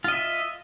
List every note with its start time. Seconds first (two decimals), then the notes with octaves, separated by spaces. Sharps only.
0.04 F4
0.08 D#5
0.12 E5